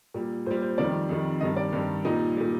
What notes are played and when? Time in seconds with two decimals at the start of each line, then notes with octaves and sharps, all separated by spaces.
0.14 A#2 G3
0.46 A#2 G3 C5
0.62 C5
0.78 F2 D#3 G3 D5
1.09 F2 D#3 G3
1.40 G2 D#3 G3 D#5
1.56 D5
1.73 G2 D#3 G3
2.05 A#2 G3 D#4
2.37 A#2 G3